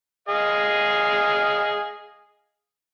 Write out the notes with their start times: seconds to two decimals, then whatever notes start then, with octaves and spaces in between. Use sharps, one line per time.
0.28 G#4 D#5 F5